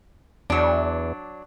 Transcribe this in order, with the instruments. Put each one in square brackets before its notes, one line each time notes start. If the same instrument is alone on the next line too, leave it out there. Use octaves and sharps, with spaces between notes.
[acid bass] E2 [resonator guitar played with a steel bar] F#3 D4